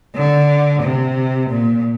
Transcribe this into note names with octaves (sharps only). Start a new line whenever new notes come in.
D3
C3
A#2